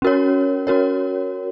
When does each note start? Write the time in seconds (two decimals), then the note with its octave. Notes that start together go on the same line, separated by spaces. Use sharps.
0.02 C#4 F#4 A#4 C#5
0.67 C#4 F#4 A#4 C#5